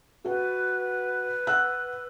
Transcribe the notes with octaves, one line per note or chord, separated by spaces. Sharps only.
F#4 B4 F#5
F#5 E6 F#6